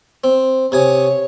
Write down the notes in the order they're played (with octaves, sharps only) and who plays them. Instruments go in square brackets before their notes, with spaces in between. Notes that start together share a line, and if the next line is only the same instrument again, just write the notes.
[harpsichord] C4
[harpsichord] C3 G#5 D#6 [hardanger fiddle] C#5